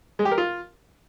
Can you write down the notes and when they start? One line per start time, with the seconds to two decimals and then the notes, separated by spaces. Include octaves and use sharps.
0.19 G#3
0.25 G4
0.31 A#4
0.38 F4